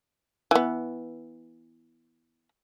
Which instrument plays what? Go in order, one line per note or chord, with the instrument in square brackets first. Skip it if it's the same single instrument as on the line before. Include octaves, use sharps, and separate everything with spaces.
[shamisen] E3 B3